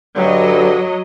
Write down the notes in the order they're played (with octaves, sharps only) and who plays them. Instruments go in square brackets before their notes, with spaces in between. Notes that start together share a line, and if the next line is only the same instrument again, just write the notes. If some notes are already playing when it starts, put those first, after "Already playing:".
[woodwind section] G2 D3 [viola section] F#3 D#5